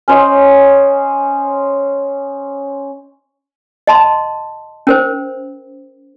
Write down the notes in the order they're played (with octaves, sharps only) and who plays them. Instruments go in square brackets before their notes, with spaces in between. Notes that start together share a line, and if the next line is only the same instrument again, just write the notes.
[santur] C#4 C5 D#5
[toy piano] D#5 A5 C6
C#4 A#4 C5